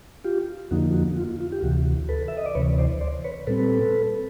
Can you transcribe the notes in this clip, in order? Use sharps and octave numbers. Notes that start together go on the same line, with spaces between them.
F4 G4
F2 D3 F3 A#3 D#4 F#4
F#4
F4
F4
G4
D2 C3 E3 F#4
A4 B4
E5
D#5
D5
D2 C3 E3 B4 C#5
C5 D5
C5 D5
B4 C#5
A#2 G3 C4 A4 B4